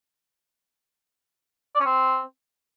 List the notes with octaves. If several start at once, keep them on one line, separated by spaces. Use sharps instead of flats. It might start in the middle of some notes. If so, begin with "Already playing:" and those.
D5
C#4
C4